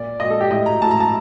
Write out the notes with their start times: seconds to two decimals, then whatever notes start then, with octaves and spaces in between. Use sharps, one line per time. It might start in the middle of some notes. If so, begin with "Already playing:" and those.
Already playing: A#2 D5
0.20 A#2 D#5
0.30 A4
0.41 G4
0.51 A2 D#5
0.66 A#5
0.82 A2 A5
0.91 A#5
1.00 A5